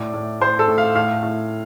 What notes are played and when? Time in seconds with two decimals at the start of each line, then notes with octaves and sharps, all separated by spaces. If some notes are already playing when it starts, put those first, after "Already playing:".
Already playing: A2 D5
0.14 A2
0.40 A2 C5
0.59 A4
0.68 A2
0.78 F5
0.95 A2 F5
1.23 A2